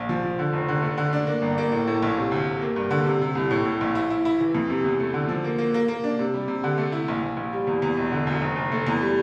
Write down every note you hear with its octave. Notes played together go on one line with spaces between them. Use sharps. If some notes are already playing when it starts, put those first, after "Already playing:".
Already playing: A#1
F3
F3
D3
F1
D3
A3
D3
D4
A#3
G1
A#3
A2
A2
A#1
C3
D2
C3
A#3
G2
D3
C3
C3
C2
A2
A2
A#1
E4
E4
E4
E3
F2
C3
E2
A3
D3
F3
A#3
A#3
A#3
A#3
D4
C3
G3
C3
D3
A3
E4
A#1
A#1
A#1
G3
E2
E2
E1
D3
D2
F1
F1
A3
E2
G3